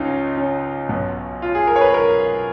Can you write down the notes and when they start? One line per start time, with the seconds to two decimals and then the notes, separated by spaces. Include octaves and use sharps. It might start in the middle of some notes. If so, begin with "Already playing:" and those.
Already playing: C#2 C#4 D#4 F4
0.37 C#4
0.89 B1 B2
1.42 F4
1.55 G#4
1.67 A#4
1.76 C#5
1.81 B4
1.94 A#4